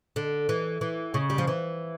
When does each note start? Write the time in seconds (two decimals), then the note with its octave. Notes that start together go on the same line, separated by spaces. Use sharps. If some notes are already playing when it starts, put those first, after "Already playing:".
0.16 D3
0.49 E3
0.81 E3
1.14 C#3
1.30 G3
1.38 F3
1.47 E3